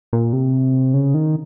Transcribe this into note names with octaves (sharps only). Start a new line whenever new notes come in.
A#2
C3
C#3
D#3